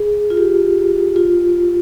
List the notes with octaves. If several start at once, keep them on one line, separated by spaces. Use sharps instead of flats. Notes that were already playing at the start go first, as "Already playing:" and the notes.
Already playing: G#4
F4
G4
F4